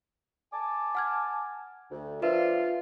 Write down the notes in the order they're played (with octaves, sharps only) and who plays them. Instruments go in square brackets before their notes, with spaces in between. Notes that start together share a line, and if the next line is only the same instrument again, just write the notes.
[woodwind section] G#5 A5 D6
[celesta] F#5 F6 G#6
[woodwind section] D2
[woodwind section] F3 D4 [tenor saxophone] F4 [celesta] A#4 B4 E5